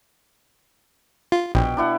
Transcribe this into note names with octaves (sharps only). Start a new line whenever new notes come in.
F4
A#1 B2 G5
D4 E4 F#5